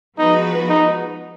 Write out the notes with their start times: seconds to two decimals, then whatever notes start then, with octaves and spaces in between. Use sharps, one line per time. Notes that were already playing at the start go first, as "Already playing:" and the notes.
0.18 F3 G#3 B3 D#4 F#4 B4
0.69 D#4